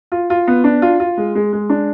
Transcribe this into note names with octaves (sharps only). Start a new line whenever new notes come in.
F4
F4
B3
D4
F4
F4
G#3
G#3
G#3
D4